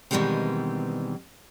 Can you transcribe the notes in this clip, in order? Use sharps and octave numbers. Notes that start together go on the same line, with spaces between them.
B2 D#3 E3 G3 G#3 C4